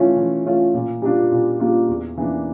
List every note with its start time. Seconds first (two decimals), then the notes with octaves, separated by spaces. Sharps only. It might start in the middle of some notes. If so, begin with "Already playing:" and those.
Already playing: E3 A3 C#4 F4
0.16 E3
0.45 A3 C#4 F4
0.74 A#2
1.02 G3 A#3 D4 F4
1.31 A#2
1.60 G3 A#3 D4 F4
1.89 E2
2.17 E3 A#3 D4